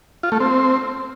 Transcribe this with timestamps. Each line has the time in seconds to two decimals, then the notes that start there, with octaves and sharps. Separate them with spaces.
0.23 F4
0.32 A3
0.40 C4